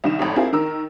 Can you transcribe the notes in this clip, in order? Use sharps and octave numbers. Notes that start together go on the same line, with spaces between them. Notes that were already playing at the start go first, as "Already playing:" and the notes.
C2 D#3 E7
G#1 F2 A2
C4 E4 F4 G#4 A#4
D#3 A#4 E6